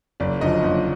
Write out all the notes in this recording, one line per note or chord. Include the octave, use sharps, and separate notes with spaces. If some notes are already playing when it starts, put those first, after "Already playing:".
F#1 D5
F#2 D3 F3 D#5
F#1